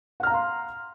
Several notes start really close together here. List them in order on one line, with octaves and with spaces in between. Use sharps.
F#5 F6 A#5 F5 C6